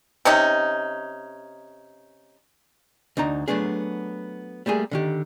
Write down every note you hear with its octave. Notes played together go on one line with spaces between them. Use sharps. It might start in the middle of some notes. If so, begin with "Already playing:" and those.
C3 C#4 D#4
D2 D4 D#4 A#5
F#3 G3 A3 B3 D4 G#4
G3 A3 A#3 G#4
D3 D#3 G4